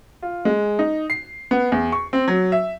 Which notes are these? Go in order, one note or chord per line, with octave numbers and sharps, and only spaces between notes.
F4
G#3
D#4
C7
B3
E2
C#6
C4
F#3
E5